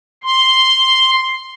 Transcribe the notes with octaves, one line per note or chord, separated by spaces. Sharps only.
C6